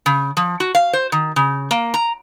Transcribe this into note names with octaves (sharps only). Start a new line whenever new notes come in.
C#3
F3
F#4
F5
C5
D#3
C#3
A#3
A#5